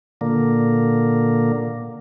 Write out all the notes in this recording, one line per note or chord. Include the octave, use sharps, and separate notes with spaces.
A#2 D3 A#3